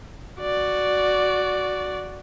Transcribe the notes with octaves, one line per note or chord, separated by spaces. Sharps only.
F#4 D5